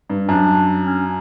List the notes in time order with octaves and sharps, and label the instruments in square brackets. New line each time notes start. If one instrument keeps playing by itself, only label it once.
[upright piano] G2
[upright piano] F#2 [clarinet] D4
[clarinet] C#4